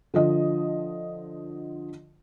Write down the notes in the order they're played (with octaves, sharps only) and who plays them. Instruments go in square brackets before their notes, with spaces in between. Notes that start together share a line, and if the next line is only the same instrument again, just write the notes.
[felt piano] D3 F3 D#5